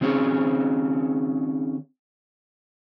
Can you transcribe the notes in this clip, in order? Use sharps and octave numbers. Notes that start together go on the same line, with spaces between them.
D#3 C4 C#4 G#4 C#5